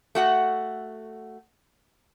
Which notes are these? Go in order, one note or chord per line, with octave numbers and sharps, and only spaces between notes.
A3 F#4 F#5